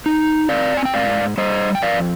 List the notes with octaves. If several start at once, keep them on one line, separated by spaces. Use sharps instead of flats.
D#4
C4 D5 F5
G#5
G5
G#2 D5 F5
G3 C5 D#5
G5
F2 D5 F5